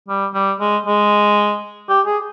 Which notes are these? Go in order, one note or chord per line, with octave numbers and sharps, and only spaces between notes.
G3
G3
G#3
G#3
G4
G#4